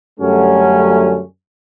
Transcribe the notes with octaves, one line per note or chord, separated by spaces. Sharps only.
F#2 D3 F#3 G3 A3 C#4